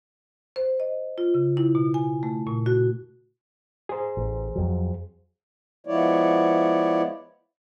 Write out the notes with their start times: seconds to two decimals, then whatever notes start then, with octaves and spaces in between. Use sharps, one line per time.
0.56 C5
0.80 D#5
1.18 F4
1.34 C#3
1.57 E4
1.75 B2
1.94 G#5
2.23 A3
2.47 A#2
2.66 F#4
3.89 G#4 C5
4.17 A1
4.55 F2 F#3
5.87 F3 G#3 B3 E4 C#5 D5